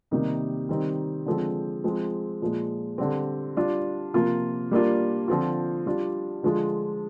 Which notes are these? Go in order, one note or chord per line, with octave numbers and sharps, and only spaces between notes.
C3 D#3 G3 A#3 D#4
D#3 G3 C4 D#4
D3 F3 G#3 C4
F3 G#3 C4
A#2 F3 G#3
D3 G3 C4
G3 D4 F4
C3 F3 A#3 F4
G3 A#3 D4 F4
D3 F3 C4 F4
G3 D4 F4
D3 F3 G#3 D4 F4